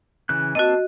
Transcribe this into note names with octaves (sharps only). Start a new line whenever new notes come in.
C#3 E3 F#6
A#3 C4 F#4 D#5 A5